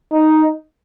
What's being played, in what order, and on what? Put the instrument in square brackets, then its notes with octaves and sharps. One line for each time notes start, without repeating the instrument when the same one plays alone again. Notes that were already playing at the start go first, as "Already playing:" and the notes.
[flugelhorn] D#4